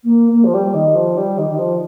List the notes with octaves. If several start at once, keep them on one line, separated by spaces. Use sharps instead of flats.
A#3
A#3
F3
G3
D#3
F3
G3
D#3
D#3
F3